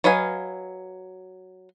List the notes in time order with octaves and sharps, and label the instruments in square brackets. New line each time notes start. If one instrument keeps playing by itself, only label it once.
[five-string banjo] F#3 B4 D#5 F5 G#5